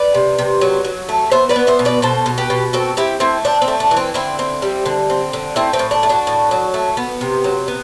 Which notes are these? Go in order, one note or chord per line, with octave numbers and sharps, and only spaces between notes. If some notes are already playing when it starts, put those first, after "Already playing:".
Already playing: B4 D5
C3
C3
F#3
F#3
A3
B3 C5 E5
B4 D5
B3
C5 E5
B2
B4 D5
B2 A4 C5
B2
G4 B4
B2
C4 F#4 A4
C4 E4 G4
A3 C4 E4
C4 D4
C4
A3
D4
E3
C4
D3 C4 E4
C4
G3
D3
C4
D3
A3 C4 E4
C4
A2
D4
A3
D4 F#4
A2
F#3
A3
B3
C3
F#3
B3